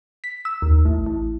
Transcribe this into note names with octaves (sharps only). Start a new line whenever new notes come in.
B6
E6
D#2
A1
A1